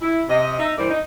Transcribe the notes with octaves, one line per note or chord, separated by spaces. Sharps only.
E4
C3 D#5
D#4 E5
G2 E3 A#3 E4 C5 D5
D#4